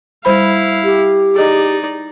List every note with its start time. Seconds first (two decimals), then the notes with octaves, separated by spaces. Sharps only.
0.25 G3 E4 C5 F5 B5
0.84 G4
1.36 D#4 G#4 D5 D#5